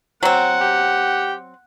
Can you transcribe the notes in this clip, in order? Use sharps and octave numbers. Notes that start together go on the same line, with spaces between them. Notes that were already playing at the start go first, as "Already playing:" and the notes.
F#3 C4 F#5
G4